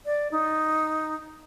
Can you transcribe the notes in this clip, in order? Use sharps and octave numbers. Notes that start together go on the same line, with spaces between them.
D5
D#4